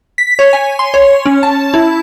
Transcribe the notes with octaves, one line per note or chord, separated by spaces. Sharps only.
B6
C#5
G#5
C6
C#5
C#4
A5
E4